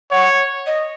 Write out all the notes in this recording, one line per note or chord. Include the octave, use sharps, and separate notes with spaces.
C#5 F#5
D#5